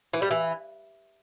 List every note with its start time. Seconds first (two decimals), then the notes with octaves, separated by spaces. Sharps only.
0.13 E3
0.22 G3
0.31 E3